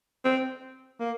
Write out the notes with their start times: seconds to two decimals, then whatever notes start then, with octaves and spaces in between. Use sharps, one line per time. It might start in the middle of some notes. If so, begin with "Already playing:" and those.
0.25 C4
1.00 A#3